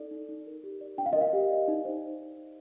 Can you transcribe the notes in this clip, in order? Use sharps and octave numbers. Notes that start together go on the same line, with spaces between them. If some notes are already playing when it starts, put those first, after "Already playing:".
Already playing: D#4 A4 D5
D#4
D#4
A#4
G4
D5
D4 G5
F5
D#5
A#4
F5
G4
D5
D#4
C5